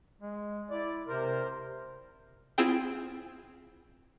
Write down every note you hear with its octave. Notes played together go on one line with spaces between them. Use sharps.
G#3
E4 D5
C3 A#4 C5
C4 E4 F4 G#4 G5